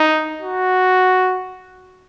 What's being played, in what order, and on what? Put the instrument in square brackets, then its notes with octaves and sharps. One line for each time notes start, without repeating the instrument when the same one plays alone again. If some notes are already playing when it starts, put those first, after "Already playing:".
Already playing: [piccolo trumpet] D#4
F#4